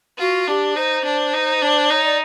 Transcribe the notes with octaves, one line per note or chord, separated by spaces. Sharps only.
F4 F#4
D4 G4
D#4 C5
D4
D#4
D4
D#4 C#5
D5